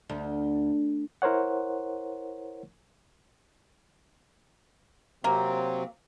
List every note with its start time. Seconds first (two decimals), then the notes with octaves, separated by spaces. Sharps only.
0.09 D2
1.22 E4 A#4 C5 C#5 F#5
5.24 C3 F#3 A#3 C4